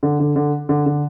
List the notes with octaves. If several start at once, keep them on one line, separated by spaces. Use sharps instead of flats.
D3
D3
D3
D3
D3